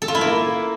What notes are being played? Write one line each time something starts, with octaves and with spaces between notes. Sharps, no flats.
A4
F4
E4
A#3